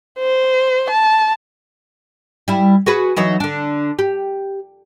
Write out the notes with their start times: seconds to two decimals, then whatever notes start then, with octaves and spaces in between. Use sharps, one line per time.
0.19 C5
0.90 A5
2.48 G3 E4
2.86 F#4 G#4 B4
3.16 E3 F#3 D#4
3.40 D3 D4
3.99 G4